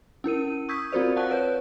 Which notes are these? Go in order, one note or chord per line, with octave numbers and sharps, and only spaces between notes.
C#4 E4 A#4 D#7
C#6 D#6 E6 G6 G#6 B6
C4 F4 F#4 A#4 C5 D5
F5 F#5 A5 C#6 F#6
B4 C#5 G6